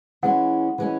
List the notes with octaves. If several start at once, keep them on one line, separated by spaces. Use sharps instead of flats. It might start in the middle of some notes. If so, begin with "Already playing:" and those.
E3 G#3 C#4 F#5
E3 G#3 C#4